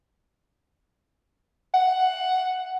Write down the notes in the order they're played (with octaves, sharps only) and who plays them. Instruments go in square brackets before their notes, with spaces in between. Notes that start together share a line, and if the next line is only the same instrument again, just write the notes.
[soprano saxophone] F#5